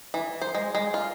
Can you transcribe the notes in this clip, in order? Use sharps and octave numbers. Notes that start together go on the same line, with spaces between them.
E3
C5
G#3
G#3
F4